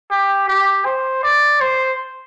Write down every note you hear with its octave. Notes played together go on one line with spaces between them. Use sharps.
G4
G4
C5
D5
C5